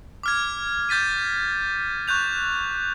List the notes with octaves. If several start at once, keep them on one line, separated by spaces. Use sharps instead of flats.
D6 F6 G#6
D6 G6 A6 B6 D#7
C#6 F#6 G6 F7